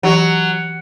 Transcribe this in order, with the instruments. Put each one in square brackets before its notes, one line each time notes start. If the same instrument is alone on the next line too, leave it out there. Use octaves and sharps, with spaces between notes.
[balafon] E3 G4 C#6 [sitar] F#3